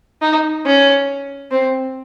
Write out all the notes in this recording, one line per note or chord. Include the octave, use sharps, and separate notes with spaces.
D#4
C#4
C4